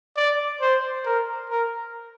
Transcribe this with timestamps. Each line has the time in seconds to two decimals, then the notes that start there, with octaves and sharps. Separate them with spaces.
0.17 D5
0.61 C5
1.06 A#4
1.50 A#4